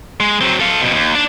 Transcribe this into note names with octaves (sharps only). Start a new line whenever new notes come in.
G#3
F#3 C4
A4 F5
F2 B2
D#2
D4